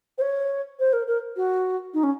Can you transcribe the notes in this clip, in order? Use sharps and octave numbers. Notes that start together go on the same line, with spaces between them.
C5
C#5
C5
A#4
A#4
F#4
D#4
C#4